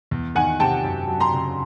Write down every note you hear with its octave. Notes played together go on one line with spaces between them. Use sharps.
E2
D#3 F#5 G#5
C3 G5 A5
F#2
F#3
A#5 C6
C#3